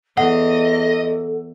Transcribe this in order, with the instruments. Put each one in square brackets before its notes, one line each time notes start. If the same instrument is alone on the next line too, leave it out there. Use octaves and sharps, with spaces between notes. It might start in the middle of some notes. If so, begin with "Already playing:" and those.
[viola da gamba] E2 [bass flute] A4 [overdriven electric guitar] D#5 [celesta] F#5